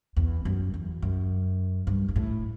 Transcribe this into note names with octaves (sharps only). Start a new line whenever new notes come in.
E2
F#2
E2
F#2
G2
G2
A2